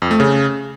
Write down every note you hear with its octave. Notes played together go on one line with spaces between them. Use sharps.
F2
A3
C#3